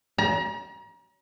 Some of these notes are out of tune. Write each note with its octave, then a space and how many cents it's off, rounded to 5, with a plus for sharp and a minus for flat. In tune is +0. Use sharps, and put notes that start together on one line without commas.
A#5 +35